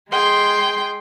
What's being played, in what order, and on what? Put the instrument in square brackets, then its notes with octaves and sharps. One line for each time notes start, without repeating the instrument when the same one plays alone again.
[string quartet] G#3 G#4 G5 C6